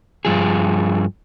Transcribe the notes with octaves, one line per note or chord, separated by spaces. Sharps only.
G2 F3 G#4